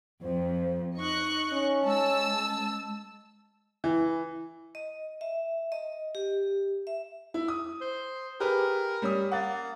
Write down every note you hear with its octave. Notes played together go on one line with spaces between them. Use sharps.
F2 C5
D#4 D#5 C#6 F#6
C#4
G#3 A5 E6
E3
D#5
E5
D#5
G4
E5
E4
D#6
C5
G4 G#4 A#4 B4
G3 C#4 D#6
A#3 F#5 A6